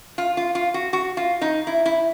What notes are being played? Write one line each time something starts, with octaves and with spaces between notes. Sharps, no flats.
F4
F4
F4
F#4
F#4
F4
D#4
E4
E4